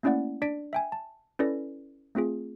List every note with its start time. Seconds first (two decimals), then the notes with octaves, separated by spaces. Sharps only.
0.03 A3 A#3 C#4 E4 D5 F#5
0.42 D4 D5 B6 D7
0.73 E5 G5 G#5
0.92 A5
1.39 C#4 E4 A4 B4 D5 A#6
2.15 A3 C4 F4 G#4